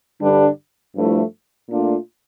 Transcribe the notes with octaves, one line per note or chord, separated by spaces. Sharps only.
G2 D3 G3 D4
G2 F3 A3 E4
A#2 A3 D4 F4